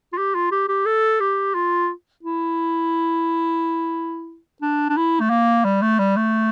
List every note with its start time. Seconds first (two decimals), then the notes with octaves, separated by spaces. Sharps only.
0.13 F4
0.18 G4
0.35 F4
0.51 G4
0.68 G4
0.86 A4
1.20 G4
1.54 F4
2.23 E4
4.62 D4
4.89 D4
4.97 E4
5.21 A3
5.30 A#3
5.65 G3
5.82 A3
5.99 G3
6.16 A3